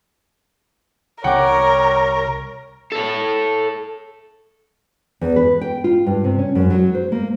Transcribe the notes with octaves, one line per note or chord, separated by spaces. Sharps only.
C2 A#4 C#5 F#5 G5 D6
A4 C#5
E2
B4
G5
F4
G2
C3
C#4
F#2
F#3
C5
A#3